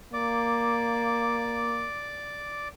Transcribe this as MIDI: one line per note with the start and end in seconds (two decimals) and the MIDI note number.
0.13 1.89 58
0.13 2.68 74
0.13 2.68 86